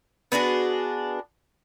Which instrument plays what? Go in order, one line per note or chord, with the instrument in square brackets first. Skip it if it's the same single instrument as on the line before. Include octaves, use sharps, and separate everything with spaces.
[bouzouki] B3 D4 F#4 G#4